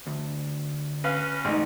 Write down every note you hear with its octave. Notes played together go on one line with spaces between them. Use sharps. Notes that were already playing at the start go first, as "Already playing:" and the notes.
D2
C#4 B4 F5
A1 G#2 D#4